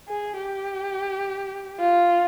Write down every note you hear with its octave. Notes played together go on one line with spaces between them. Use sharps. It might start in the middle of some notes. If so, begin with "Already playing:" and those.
G#4
G4
F4